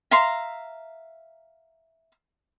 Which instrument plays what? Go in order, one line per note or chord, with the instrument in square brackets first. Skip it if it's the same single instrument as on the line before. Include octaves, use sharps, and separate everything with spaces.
[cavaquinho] E5 F5 A#5 C6